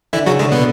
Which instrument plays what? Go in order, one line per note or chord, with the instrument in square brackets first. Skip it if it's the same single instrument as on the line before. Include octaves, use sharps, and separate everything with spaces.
[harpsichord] D3 [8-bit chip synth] E3 E4
[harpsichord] C#3 [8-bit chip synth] F#3 F#4
[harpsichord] D3 [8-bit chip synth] G#3
[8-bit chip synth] B2 B3